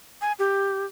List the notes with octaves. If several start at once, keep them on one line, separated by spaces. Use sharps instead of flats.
G#5
G4